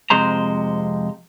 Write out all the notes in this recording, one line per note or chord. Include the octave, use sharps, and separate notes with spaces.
F2 C3 G#3 C5 A#5